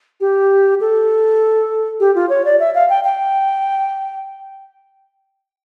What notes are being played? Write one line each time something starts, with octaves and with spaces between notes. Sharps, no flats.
G4
A4
G4
F4
C#5
D5
E5
F5
G5
G5